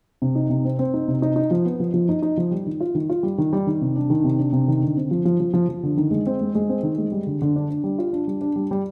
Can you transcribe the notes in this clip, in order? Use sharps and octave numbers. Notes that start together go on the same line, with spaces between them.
C3
D#4
C3
C4
C4
D#4
C3
D#4
D#4
F3
B3
F3
F3
D#4
D#4
F3
G3
D#3
F4
D#3
F4
G3
D#3
G3
D#3
C3
D4
D#3
C3
D4
C3
D#3
D3
C4
F3
F3
F3
F3
F3
D3
D#3
G#3
C4
G#3
G#3
C4
D#3
G#3
G3
D3
D3
D4
D4
G3
F4
D4
G3
D4
G3
G3